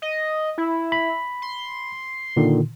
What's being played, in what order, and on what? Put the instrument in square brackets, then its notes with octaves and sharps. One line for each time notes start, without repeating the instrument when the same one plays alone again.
[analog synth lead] D#5
E4
[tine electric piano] B5
[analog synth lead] C6
[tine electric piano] A#2 D3 D#3